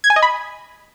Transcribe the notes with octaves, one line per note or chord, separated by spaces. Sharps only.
G#6
G#5
D#5
B5